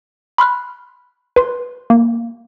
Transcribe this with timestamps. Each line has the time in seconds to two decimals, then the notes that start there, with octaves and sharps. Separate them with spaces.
0.38 B5 C6 F6 F#6
1.36 B4 C6
1.90 A#3